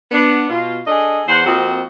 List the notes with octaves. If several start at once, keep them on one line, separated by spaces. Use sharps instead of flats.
B3 D4
B2 F4
D4 G#4 A4 D#5
E2 C5 F#5
F2 F3 A#3 C4 F#4 D#5